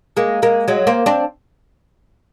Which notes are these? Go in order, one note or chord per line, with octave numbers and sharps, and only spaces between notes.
G#3 A#3
G#3 A#3
F#3 G#3
A#3 C4
C4 D4